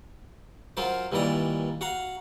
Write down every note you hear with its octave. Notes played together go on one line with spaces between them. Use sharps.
F#3 C#4 F4 A#4 C5
G2 A#2 D#3 E3 D5 A#5
F#4 F5 F#5 A#5